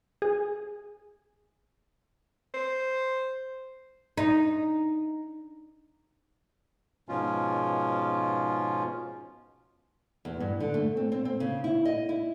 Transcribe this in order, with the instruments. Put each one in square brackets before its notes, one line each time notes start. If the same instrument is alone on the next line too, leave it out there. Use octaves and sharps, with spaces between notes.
[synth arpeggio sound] G#4
[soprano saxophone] C5
[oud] D#4
[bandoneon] G#2 B2 F3 C#4 F4
[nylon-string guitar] E2
G2
D3
A3
C4
C4
C4
C#3
E4
D#5
E4